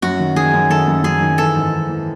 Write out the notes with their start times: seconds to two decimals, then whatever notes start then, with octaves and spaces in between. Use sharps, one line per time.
0.02 F#2 F#4
0.20 D#3
0.36 D#3 G#4
0.53 F#2
0.70 D#3 A4
0.87 F#2
1.03 F#2 G#4
1.21 D#3
1.38 E3 A4
1.56 G#2
1.73 G#2
1.89 E3